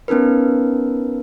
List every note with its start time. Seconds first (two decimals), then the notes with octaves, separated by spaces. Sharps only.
0.08 B3 C#4 D#4 A#4 B4